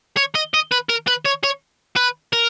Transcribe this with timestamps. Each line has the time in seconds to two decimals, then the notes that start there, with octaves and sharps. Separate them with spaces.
0.17 C#5
0.35 D#5
0.54 D#5
0.71 B4
0.89 A#4
1.07 B4
1.25 C#5
1.44 C#5
1.96 B4
2.33 A#4